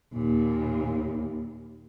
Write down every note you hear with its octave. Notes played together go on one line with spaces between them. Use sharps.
D#2 A#2